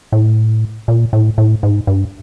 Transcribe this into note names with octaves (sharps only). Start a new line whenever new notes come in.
A2
A#2
A2
A2
G#2
G2